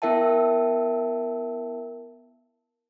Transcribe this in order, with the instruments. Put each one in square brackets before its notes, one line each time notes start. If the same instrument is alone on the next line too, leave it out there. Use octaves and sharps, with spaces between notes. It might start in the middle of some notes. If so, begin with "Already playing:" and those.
[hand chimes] B3 E4 A#4 E5 G5 A5